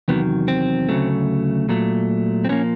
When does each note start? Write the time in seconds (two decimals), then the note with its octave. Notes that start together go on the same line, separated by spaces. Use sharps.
0.08 E2 C3 D#3 F#3 B3
0.48 C4
0.89 D2 C#3 F#3 A3
1.69 A#2 F#3 A3
2.45 C4
2.49 A#2 F3 A#3 B3 C#4